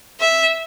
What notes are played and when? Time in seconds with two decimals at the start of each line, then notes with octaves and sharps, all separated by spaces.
0.20 E5